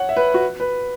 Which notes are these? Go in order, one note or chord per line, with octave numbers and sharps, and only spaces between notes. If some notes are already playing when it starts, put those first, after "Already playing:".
Already playing: C#5 F#5
E5
B4
F#4
B4